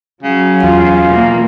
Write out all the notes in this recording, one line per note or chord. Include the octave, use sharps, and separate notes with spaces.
C#3 F#3
E2 F4
B2 E3 A#3